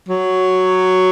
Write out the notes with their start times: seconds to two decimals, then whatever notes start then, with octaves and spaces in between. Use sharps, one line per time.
0.08 F#3